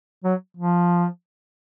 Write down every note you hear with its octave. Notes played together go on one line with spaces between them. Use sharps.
F#3
F3